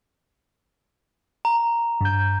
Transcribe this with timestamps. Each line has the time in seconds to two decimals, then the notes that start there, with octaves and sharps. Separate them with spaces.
1.45 A#5
2.01 G2 G6